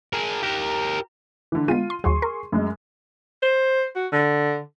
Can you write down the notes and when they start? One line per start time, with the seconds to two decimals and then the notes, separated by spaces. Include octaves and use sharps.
0.13 G#4 A#4
0.43 G4 A#4
1.52 D3 E3
1.68 G#3 B3 F4 D#7
1.90 C6
2.04 D#2 F#3 G#4 C6 C#6
2.22 A#4
2.52 F#2 G#3
3.43 C5
3.95 F#4
4.12 D3